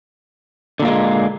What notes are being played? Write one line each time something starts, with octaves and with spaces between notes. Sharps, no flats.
A#2 D3 G#3 A#3